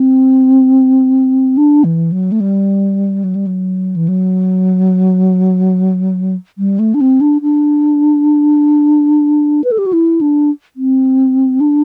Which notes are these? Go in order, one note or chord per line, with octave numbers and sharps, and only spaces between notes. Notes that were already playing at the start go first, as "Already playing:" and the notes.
Already playing: C4
D4
E3
F#3
A3
G3
F#3
G3
F#3
E3
F#3
G3
A3
D4
C4
D4
D4
B4
A4
G4
F#4
E4
D4
C4
D4